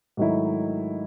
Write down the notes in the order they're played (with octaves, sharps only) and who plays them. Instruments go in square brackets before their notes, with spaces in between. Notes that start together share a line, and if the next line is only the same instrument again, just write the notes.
[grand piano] G#2 D#3 F#3 A3 E4